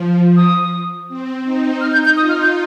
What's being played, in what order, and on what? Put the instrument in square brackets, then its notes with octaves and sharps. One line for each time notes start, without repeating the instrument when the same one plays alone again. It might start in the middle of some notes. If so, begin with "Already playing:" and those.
Already playing: [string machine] F3
[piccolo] D#6
[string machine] C4
D#4
[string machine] D#4 [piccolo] F6
[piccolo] G6
G6
[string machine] F4 [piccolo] D#6
[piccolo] F6
G6